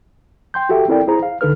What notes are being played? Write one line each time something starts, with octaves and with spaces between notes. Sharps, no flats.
G5 C6 G6
F#4 G4 A4 E5 G5
C4 E4 A4 A#4 D5 G5
E4 G#4 C5 A#5
F5
C2 D3 D#4 A4 B4 F6